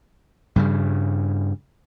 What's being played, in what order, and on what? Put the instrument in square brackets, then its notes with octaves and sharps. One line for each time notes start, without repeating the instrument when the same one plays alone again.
[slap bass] G2 C#3 G3